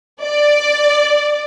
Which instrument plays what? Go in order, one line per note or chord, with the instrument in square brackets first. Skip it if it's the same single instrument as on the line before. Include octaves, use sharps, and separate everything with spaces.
[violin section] D5